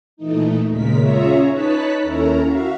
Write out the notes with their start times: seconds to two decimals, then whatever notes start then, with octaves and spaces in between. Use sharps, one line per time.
0.17 A#2 E3 A3 D#4
0.68 D#2 A#2 C#3 G#3 A#4 B6
0.98 C#4 F4 G#4 C#5 E5 A#5
1.50 D#4 B4 C#5 A5 F#6 B6
2.00 D#2 C#4 E4 A4 A#4 A#5
2.43 F#4 E5 F5